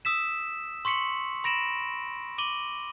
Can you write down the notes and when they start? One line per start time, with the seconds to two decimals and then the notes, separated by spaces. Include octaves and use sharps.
0.05 D#6 E6 B6 E7
0.85 C6 C#6 B6 C#7 F#7
1.44 B5 A#6 D7 E7 F#7
2.38 D6 D#7 F#7 G7